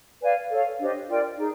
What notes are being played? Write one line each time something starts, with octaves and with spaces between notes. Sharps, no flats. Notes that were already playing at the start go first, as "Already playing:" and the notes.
B4 D5 F5 G#5
A4 C#5 F5
D4 G4 C5 D#5
F4 A#4 D5 G5
D#4 G#4